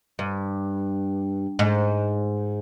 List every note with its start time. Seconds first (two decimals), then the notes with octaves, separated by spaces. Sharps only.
0.19 G2
1.59 G#2